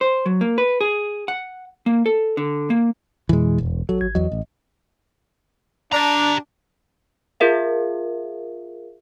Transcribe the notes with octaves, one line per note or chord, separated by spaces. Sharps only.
C5
F#3
A#3
B4
G#4
F#5
A#3
A4
D3
A#3
F2 B2 E3 G#3
E1
A1 F#3 A4
G#1 G#6
E2 F#3 D#5
A1
D4 G4 A#5
F4 G#4 A#4 E5 F5